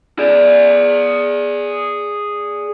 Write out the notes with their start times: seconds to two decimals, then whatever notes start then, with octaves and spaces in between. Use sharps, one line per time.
0.19 G#4 D5